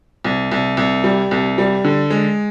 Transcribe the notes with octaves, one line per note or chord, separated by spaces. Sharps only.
C2
C2
C2
G3
C2
G3
D3
G#3